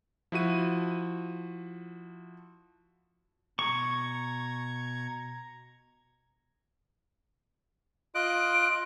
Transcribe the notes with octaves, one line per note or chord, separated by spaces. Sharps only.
F3 E4 F#4 D#7
B2 A#5 C#6 G#6
F4 D#5 F#6 D7